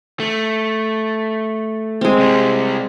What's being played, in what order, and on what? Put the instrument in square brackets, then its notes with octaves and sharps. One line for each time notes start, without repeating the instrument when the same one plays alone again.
[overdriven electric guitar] A3
[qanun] G#3 C4
[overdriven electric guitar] C3 G3